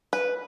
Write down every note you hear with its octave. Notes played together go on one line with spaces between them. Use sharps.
B4